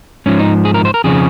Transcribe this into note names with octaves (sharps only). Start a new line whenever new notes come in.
G#2 F3 C#4
D#4
G#4
A#4
C5
A#4
F2 C#3 F3 G#4